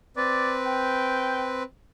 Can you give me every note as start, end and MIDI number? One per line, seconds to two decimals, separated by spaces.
0.17 1.63 60
0.17 1.63 71
0.17 0.54 74
0.65 1.47 79